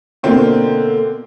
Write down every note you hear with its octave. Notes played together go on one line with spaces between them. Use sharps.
B2 D3 A#3 C4 F4